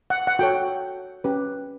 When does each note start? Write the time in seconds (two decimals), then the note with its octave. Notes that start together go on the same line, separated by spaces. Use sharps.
0.10 F#5
0.27 F#5
0.39 F#4 A4 C#5 G5
1.24 C#4 G4 B4